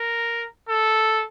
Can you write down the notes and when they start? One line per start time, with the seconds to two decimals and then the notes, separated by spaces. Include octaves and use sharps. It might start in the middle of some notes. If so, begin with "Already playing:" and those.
Already playing: A#4
0.69 A4